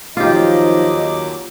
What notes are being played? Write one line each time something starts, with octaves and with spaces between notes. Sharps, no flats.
D#2 F3 F#3 D#4 F4 G4 D#5 D6